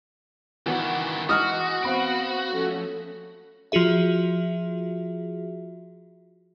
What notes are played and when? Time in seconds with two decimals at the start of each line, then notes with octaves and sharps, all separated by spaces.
0.66 D#3 E3 B3 E4 F#4
1.29 E3 G#3 D#4 F#4 D#6 F6
1.83 B3 C4 F5 B5 D7
2.52 F3 A3 C#4
3.72 F3 F4 F#4 G#4 E5